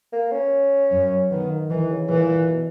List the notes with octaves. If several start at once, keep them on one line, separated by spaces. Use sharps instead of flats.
A#3
C#4
F#2
D#3 B3
D#3
D#3 E3
C#3
A#2 E3
B2